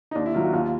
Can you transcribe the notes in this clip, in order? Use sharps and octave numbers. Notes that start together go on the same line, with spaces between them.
D#4
D#2 D4
E4
D#3 F#3 F4
F#4
D#2 F4